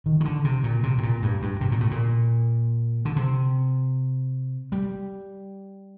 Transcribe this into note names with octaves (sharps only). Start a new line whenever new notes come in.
D#3
D#3
D3
C3
A#2
C3
A2
A#2
G2
G2
C3
A#2
A2
A#2
D3
C3
G3